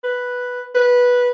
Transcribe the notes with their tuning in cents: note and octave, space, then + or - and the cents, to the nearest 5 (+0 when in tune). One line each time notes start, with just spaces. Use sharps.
B4 +0
B4 -10